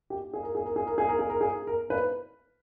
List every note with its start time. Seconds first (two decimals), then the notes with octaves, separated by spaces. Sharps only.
0.10 G4
0.34 G#4
0.43 A#4
0.55 G#4
0.65 A#4
0.76 G#4
0.87 A#4
0.98 G#4
1.08 A#4
1.19 G#4
1.30 A#4
1.41 G#4
1.67 A#4
1.90 B4